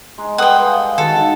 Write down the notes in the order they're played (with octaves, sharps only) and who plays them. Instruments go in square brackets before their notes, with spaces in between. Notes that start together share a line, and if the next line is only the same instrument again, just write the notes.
[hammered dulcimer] G#3 D#4
[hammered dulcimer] G3 G#4 A4 [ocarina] B4 [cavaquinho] F#5 G5 [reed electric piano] C6 D#6
[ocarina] F5 [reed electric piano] G#5
[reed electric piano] D#3 A6 [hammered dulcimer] G#3 F#4 [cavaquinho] A4
[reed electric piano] D#4